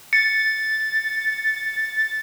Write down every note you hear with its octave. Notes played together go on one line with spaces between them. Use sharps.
A6 C#7